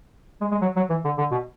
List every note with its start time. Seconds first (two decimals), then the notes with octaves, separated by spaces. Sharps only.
0.41 G#3
0.52 G#3
0.62 F#3
0.77 F#3
0.90 E3
1.05 D3
1.18 D3
1.32 B2